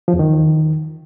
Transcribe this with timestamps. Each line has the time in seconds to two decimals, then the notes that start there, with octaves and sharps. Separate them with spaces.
0.08 F3
0.14 E2
0.19 D#3